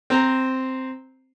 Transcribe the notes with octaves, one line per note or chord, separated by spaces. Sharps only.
C4 C5 A#5